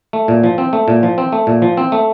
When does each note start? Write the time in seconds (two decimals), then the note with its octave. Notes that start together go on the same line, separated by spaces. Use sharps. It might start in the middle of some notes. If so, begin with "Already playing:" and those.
0.13 A3
0.28 A#2
0.44 F3
0.58 C4
0.73 A3
0.88 A#2
1.03 F3
1.18 C4
1.32 A3
1.47 A#2
1.62 F3
1.77 C4
1.92 A3